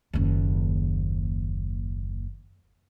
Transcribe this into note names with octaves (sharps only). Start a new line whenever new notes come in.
F#1 D#2